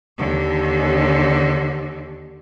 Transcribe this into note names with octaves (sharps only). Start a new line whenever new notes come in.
D#2 D3